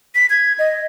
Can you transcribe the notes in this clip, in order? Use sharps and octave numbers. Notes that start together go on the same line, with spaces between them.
B6
G#6
D#5